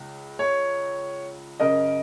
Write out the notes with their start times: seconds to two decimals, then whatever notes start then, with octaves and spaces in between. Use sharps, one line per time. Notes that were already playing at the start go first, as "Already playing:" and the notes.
Already playing: C#2 C#3
0.39 C#5
1.60 F#2 C#3 A#4 D#5